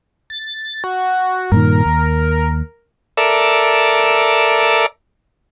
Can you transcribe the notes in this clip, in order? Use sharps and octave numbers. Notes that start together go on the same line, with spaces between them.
A6
F#4
G2 A#2 D#3 A#4
D#2
A4 A#4 D5 E5